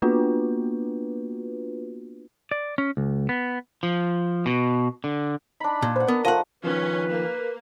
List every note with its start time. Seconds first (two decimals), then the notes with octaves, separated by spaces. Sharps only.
0.02 A#3 B3 D4 F4 F#4 B4
2.51 D5
2.78 C#4
2.97 C#2
3.29 B3
3.83 F3
4.46 B2
5.04 D3
5.60 D4 D#4 B5
5.82 A#2
5.96 B4 C5 F#5
6.08 B3 A#4
6.25 F3 A3 D#4 D#5 F#5
6.64 D#3 F3 C#4 B4
7.09 A#3